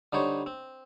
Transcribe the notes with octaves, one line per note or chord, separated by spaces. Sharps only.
D3 G3 D#4 C5 C#5
C4